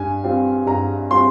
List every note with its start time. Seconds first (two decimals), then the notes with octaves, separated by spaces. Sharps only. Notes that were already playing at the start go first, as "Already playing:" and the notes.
Already playing: G2 G#5
0.24 G3 C4 F4
0.67 G2 A#5
1.10 G3 C4 F4 C6